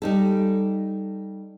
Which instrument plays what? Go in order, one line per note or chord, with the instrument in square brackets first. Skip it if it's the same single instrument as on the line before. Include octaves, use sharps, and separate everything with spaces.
[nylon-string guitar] G3 D#4 A4